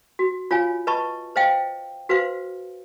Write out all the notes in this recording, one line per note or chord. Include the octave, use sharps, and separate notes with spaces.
F#4
F4 C#5 F5 G#5
B4 D#5 A5 B5 C#6
C5 D#5 F5 G5
F#4 B4 C5 F5